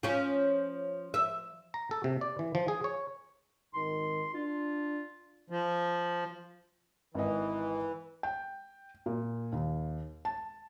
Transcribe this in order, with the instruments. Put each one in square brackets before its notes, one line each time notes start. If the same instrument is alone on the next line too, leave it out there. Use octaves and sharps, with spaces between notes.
[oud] F3 C#4
E5
[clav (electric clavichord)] A#5
A4
C3
D5
E3
F3
G#4
C#5
[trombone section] G#1 D#3 [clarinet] C6
[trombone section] D4 [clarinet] F4
[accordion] F3
[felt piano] G#1 D#5 [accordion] E3
[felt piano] G5
A#2
D#2
A5